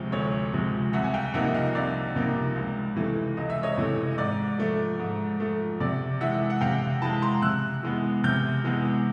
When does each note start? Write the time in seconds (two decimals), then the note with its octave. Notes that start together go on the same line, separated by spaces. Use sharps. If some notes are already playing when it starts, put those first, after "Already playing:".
Already playing: D2 C3 F3 G#3
0.12 D2 C#5
0.54 C3 F3 G#3
0.93 C2 E5 F#5
1.04 G#5
1.14 F5 G5
1.34 C3 F3 A#3 D#4 E5 F#5
1.54 D#5 F5
1.75 C2 D5 E5
2.15 C3 F3 A#3 D#4
2.56 C#2
2.96 C3 E3 A3
3.37 C#2 D#5
3.50 E5
3.63 C#5 D#5
3.77 C3 E3 A3
4.11 D#5
4.18 G#2 D5
4.58 F3 A3
4.99 G#2
5.40 F3 A3
5.80 C3 D5
6.21 E3 G#3 E5 F#5
6.50 F#5
6.61 C3 F5 G5
7.02 E3 G#3 A5 B5
7.22 A#5 C6
7.42 C3 E6 F#6
7.83 E3 G#3 B3
8.24 C3 F6 G6
8.64 E3 G#3 B3